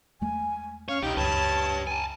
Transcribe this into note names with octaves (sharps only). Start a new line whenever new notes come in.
E2 G#3 A3 G#5
C#4 C#5 F5
B1 D#4 E4 G4 G5
C#2 F#2 G4 B4 C#5 A5
G#5 A5